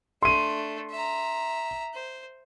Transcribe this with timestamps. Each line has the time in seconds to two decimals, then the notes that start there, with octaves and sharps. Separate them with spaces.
0.23 A3 D4 C6 D#7
0.91 E5 A#5
1.94 C5